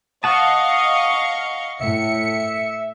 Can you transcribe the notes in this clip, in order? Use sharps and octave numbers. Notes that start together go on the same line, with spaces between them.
D#5 F5 F#5 A5 C#6 D#6
A2 E5 C#7